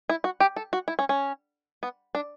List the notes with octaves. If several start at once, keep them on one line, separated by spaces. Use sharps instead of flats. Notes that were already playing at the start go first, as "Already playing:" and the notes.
E4
F#4
G4
A4
F#4
E4
C#4
C#4
B3
D4